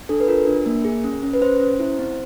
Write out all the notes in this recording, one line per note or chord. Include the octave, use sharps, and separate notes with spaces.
D4 A4
B4
F4 A#4
D4
A#3
G#4
C#4
C#4
B4
C#4 C5
C#4
E4
C4